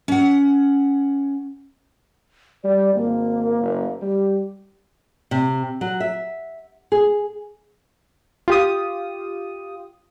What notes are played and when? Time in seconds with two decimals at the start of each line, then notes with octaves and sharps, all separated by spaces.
0.08 C#4 F#5
2.64 G3 D5
2.95 G#1 A#3
3.61 F#1
4.01 G3 G4
5.31 C3
5.81 F#3
6.00 E5
6.92 G#4
8.48 F4 G4 D#6